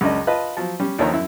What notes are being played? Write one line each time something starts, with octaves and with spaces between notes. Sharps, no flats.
C#2 F#2 C#4 D4 D#5
F4 B4 D#5 A5
F3 F#3
G3 C#4
D#2 D3 D#3 F3 C#5 A#5
F#2 E4